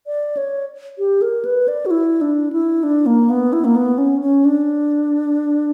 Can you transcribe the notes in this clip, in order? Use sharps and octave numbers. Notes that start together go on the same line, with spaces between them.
D5
C#5
G4
A#4
B4
D5
F#4
E4
D4
E4
D4
A#3
B3
E4
A#3
B3
C#4
C#4
D4